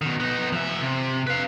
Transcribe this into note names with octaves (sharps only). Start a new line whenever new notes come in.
B2 D#3
B3 D#4
F3 E5
C3
B4 F5